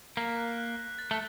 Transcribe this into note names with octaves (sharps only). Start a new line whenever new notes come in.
A#3 B6
F#6
F#6
F#6
A6
A3